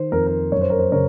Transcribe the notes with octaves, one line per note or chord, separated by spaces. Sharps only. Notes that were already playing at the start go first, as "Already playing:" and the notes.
Already playing: D#3 C5
F2 A#4
A#4
F#2 C#5
C5
A#4
C5
C#3 A#4 C#5